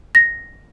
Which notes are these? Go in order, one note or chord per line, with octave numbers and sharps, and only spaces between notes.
A#6